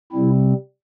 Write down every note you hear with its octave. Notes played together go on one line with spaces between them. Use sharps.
C3 G3 C4 E4